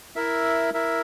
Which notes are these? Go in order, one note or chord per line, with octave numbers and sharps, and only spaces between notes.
E4 A#4 E5
E4 A#4 E5